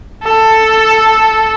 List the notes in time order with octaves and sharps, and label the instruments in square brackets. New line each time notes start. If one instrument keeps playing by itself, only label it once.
[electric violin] A4